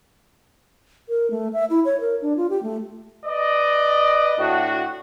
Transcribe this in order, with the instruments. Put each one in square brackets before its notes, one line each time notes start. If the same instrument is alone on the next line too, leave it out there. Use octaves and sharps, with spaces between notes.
[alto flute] A#4
A3
E5
E4
C#5
A#4
D4
F4
G4
A3
[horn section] B4 D5 D#5
A2 D4 F#4